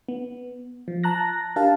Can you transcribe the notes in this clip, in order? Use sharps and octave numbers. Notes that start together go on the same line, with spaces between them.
B3
F3
A5 A#5 F#6 A#6
D4 G4 A#4 F5 A5